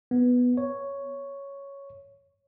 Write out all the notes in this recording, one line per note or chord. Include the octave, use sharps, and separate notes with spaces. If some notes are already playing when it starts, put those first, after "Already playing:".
B3
C#5